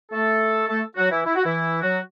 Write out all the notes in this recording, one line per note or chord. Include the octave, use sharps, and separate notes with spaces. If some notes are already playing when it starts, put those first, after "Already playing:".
A3 A4
A3 A4
F#3 F#4
E3 E4
E4
F#4
E3 E4
F#3 F#4